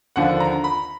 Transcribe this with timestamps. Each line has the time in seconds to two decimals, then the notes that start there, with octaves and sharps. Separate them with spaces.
0.16 D#2 D3 F3 F#5
0.40 A#5
0.64 B5